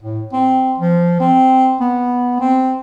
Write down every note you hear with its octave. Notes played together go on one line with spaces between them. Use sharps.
A2
C4
F3
C4
B3
C4